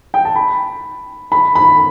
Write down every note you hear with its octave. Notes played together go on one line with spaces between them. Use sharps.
G5
A5
B5
B5
B5